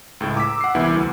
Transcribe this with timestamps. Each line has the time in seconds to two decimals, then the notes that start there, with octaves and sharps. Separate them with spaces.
0.20 C#2 A2
0.36 A#5 D6 E6 B6
0.61 F#5 C7
0.75 C2 E3 B3 E4
0.96 D2